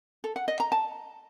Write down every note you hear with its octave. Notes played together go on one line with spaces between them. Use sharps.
A4
F#5
D#5
A#5
A5